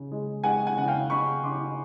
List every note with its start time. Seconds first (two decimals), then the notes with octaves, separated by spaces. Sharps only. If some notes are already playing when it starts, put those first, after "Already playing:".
Already playing: C#3
0.11 G#3
0.44 G#3 F#5 G#5
0.67 F#5 G#5
0.78 C#3 F#5
0.88 F5 G5
1.10 C#3 B5 C#6
1.43 C#3 C6 D6